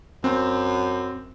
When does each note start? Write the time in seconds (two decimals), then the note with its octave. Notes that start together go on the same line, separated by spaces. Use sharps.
0.24 F#2 C4